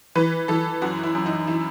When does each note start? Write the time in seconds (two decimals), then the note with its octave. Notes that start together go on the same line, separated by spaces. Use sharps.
0.15 E3 B4
0.48 E3 A4
0.82 F#2 F#4
1.03 E4
1.15 F#2
1.26 D#4
1.47 E3 E4